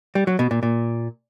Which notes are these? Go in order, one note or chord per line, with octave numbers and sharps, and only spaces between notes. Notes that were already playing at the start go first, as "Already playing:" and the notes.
G3
F#3
B2
A#2
A#2